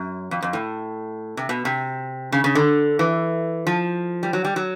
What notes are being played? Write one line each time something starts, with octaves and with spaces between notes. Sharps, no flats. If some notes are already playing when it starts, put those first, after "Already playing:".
Already playing: F#2
F2
F2
A2
C3
B2
C3
C#3
C#3
D3
E3
F3
G3
F#3
G3
F#3